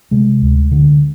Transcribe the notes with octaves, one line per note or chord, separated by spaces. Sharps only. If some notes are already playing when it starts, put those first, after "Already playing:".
C3 G#3
D2
D3